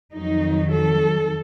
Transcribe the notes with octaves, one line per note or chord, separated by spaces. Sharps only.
F2 D#3 F#3 D#4
A4